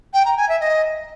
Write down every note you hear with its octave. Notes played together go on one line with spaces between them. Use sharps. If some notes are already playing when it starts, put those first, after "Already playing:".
G5
A#5
G#5
E5
D#5